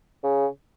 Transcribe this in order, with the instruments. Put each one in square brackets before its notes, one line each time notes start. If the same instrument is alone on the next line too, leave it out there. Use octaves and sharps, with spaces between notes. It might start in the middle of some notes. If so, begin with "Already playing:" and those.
[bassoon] C#3